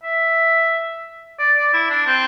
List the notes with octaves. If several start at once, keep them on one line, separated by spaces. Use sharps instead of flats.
E5
D5
D5
E4
D4
C4